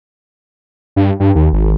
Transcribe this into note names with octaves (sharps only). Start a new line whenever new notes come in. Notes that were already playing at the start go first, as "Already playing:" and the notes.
G2
G2
D#2
G#1